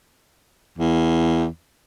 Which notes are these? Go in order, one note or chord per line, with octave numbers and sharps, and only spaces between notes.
E2